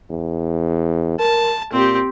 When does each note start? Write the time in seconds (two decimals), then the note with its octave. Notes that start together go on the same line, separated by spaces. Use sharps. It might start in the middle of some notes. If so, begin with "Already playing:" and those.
0.10 E2
1.20 A#4 A5
1.73 A#2 C4 G4